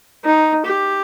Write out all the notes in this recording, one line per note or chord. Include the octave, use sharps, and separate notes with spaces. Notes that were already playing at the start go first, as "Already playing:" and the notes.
D#4
G4